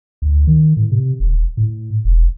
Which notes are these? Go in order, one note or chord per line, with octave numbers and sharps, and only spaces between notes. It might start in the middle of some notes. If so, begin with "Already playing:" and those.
D2
D#3
A2
C3
D#1
A2
E1